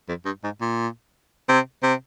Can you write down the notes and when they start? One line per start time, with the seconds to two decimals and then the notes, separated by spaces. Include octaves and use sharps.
0.08 F2
0.25 G2
0.44 G#2
0.61 A#2
1.49 C3
1.83 C3